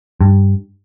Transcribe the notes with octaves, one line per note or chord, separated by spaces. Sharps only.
G2